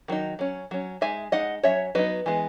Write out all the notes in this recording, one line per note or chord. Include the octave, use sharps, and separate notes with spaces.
D#3 F#3 D#4
F#3 C#4
F#3 C#4
G#3 D#4 E5 G#5
G#3 D#4 D#5 F#5
F#3 C#4 C#5 E5
F#3 B3 D#4 B4 D#5
E3 G#3 B3